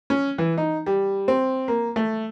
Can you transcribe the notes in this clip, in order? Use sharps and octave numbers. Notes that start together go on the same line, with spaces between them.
C#4
E3
D#4
G3
C4
A#3
A3